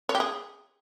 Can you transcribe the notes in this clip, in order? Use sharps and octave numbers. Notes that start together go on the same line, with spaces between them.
C#5
G4
G#4